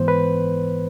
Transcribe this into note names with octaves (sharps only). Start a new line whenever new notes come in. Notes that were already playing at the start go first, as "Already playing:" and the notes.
Already playing: G#2 E3 B3 C5
B4